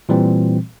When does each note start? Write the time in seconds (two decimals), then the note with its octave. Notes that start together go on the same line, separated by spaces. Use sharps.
0.09 A#2 E3 G3 C4